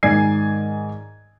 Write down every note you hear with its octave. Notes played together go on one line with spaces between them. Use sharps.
G#2 D#3 D5 G#5 G#6 C7